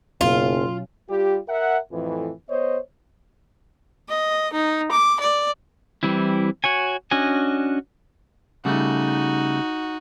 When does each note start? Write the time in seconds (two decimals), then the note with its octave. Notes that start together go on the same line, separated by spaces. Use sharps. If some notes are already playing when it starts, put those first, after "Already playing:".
0.21 F#1 B2 F#3 C#4 F4
1.10 G3 F4 G4
1.49 A#4 E5 F#5
1.92 F2 A2 E3
2.50 B3 C5 C#5 D#5
4.09 D#5
4.53 D#4
4.91 D6
5.20 D5
6.03 E3 G3 C4 E4
6.64 F#4 C#5 G#5
7.11 C#4 D4 F#4 D#5 G#5
8.65 C#3 G3 A3 D#4 F#4